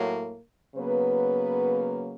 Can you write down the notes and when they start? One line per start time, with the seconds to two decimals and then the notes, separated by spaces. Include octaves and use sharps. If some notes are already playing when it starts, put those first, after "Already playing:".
Already playing: A2 F#3 A#3
0.76 C#3 F#3 A#3 B3 B4